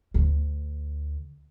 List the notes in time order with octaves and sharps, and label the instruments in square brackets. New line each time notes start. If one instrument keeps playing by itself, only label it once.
[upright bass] D2